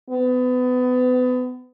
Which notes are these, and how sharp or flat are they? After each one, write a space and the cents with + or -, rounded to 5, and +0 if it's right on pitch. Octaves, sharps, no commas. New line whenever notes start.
B3 +30